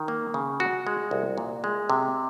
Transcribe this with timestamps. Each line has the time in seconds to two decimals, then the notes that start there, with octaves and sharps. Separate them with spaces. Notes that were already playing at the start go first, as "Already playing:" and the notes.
Already playing: D#3
0.08 A#3
0.34 C#3
0.60 F#4
0.87 G#3
1.11 C2
1.38 A#2
1.64 G#3
1.90 C3